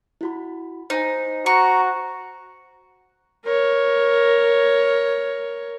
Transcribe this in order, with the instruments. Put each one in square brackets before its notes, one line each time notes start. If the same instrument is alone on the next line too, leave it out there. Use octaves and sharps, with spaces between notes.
[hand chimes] E4 F#4 B5
[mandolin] D#4 [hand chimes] C5 G#5
[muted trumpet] F#4 [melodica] A#5 [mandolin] C#6
[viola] A#4 C#5